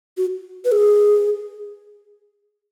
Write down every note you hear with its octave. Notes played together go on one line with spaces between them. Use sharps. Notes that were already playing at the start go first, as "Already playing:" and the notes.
F#4
B4
G#4